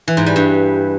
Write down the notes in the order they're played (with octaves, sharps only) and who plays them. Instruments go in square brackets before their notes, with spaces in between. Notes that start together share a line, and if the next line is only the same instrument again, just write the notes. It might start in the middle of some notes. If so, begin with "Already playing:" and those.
[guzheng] E3
G#2
G3
G2